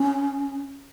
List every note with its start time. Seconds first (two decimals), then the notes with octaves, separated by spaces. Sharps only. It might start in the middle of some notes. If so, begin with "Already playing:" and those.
Already playing: C#4